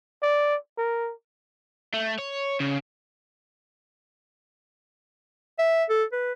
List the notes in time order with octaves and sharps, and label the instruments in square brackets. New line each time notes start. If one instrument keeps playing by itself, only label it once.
[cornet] D5
A#4
[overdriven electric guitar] A3
C#5
C#3
[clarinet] E5
A4
B4